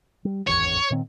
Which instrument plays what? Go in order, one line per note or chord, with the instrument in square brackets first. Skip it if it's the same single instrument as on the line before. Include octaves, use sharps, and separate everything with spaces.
[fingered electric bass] G3
[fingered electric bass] D1 G#1 E2 [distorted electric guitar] C#5
[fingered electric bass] A#2 D#3 C4